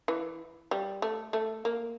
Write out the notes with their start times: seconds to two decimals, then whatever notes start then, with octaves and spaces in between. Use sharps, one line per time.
0.08 E3
0.71 G3
1.02 A3
1.33 A3
1.65 A#3